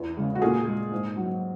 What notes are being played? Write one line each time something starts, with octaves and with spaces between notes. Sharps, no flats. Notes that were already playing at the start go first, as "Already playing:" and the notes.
Already playing: E2
C#3 G#3
F#4
A#2 G#4
G#3
G#2
F#3